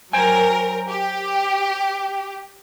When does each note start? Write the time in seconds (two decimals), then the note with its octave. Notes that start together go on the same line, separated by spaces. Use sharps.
0.13 F#3 A#4 C5 G5 G#5
0.88 G4